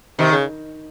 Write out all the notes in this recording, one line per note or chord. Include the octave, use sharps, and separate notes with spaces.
C3 D#3
C#3